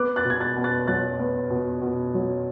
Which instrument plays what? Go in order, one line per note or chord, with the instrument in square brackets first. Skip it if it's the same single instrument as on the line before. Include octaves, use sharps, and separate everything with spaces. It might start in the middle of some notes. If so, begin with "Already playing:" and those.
Already playing: [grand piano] B3 D6 F#6
F#6 A6
B2
G#6
F#6 A6
B2
F#6 A6
F#3 F#6 A6
B3
B2
B2
F#3